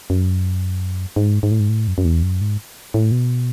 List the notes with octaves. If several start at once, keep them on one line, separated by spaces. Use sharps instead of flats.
F#2
G#2
G#2
A2
G#2
A2
F#2
F#2
E2
F#2
G#2
A2
B2